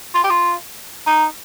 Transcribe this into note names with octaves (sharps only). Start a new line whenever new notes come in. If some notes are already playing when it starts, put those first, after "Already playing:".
F4
G4
F4
D#4